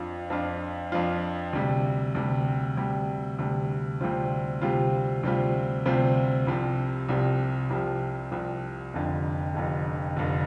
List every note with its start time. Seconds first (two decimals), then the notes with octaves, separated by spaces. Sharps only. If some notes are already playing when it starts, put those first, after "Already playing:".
Already playing: F2 F3 D4 F4
0.30 F2 F3 D4 F4
0.92 F2 F3 D4 F4
1.53 D2 C3 G3
2.15 D2 C3 G3
2.77 D2 C3 G3
3.39 D2 C3 G3
4.01 D2 C3 G3 C4 F4
4.62 D2 C3 G3 C4 F4
5.23 D2 C3 G3 C4 F4
5.85 D2 C3 G3 C4 F4
6.47 C2 C3 F3
7.09 C2 C3 F3
7.70 C2 C3 F3
8.31 C2 C3 F3
8.93 F1 F2 D3
9.55 F1 F2 D3
10.17 F1 F2 D3